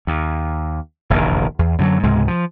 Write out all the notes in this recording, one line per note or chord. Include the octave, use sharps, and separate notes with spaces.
D#2
F1 A#1 E2 D#3
E2
F#2 D3 F3 F#3
C#2 G#2 C3 G#3
F3